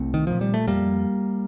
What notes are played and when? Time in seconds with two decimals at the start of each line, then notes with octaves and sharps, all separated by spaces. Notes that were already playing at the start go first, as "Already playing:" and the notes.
Already playing: C2 A3 C4
0.14 D#3
0.27 A#2 F3
0.41 G3
0.54 A3
0.68 F2 G3 A#3